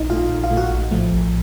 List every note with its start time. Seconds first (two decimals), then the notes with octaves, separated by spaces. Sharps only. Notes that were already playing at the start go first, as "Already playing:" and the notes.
Already playing: A#1 D#4 D#5
0.09 A#2 A3 F4 F5
0.30 A#1
0.43 F4 F5
0.51 A#2 A3
0.57 F#4 F#5
0.71 A#1
0.91 A2 F3 A3
1.12 A#1